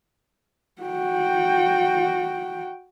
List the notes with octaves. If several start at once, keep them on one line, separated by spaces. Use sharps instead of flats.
F#4 G5